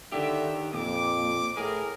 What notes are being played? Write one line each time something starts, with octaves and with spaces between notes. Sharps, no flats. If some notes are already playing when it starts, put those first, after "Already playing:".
D3 D#3 G4 E5
F2 A#2 D6
A2 G#4 A#4